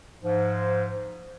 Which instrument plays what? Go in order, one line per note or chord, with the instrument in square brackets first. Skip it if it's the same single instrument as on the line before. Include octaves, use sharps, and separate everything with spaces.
[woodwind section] G#2 F3